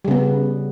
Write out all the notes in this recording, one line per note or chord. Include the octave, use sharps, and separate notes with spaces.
C#3 G3 B3